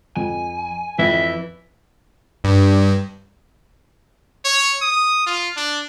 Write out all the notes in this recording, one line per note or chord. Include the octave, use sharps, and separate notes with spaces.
F2 G#5
F2 E3 E5
G2
C#5
D#6
F4
D4